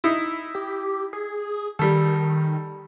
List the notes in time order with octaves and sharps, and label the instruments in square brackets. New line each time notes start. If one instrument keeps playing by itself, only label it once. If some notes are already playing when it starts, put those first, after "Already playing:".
[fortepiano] D#4 E4
[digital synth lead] G4
G#4
[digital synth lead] D#3 [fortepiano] G3 A4